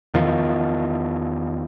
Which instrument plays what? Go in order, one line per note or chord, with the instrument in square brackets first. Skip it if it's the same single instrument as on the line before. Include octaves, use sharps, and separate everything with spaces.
[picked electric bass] E2 D#3 F3